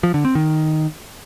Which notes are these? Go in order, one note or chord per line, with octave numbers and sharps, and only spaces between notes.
F3
D3
C4
D#3